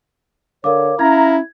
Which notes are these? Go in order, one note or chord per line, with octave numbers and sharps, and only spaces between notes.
D3 A#4 C#5 F5 D6
C#4 E4 F5 A#5 G#6